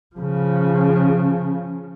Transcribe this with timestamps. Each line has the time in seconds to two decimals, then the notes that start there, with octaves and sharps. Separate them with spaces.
0.16 C#3 F3